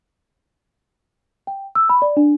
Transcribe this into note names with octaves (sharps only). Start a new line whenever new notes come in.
G5
E6
B5
D5
D4